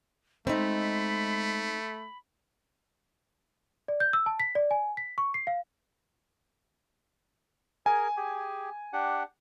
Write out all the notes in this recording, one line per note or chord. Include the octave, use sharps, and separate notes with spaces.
G#3 A3 C4 D#4 B5
D5
G6
E6
A5
B6
D5
G#5
B6
C#6
C7
F5
G#4 A#4 G#5
G4 G#4
D4 G4 F#5